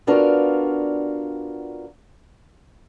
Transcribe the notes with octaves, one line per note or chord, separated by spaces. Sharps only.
B3 D4 F4 F#4 A#4 D5